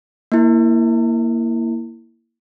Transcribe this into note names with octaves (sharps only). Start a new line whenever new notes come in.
A#3 E4